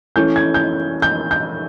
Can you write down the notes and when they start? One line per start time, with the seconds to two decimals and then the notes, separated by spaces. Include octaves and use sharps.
0.16 E3 A3 C#4 G6
0.36 G#6
0.54 G6
1.02 G6
1.31 G6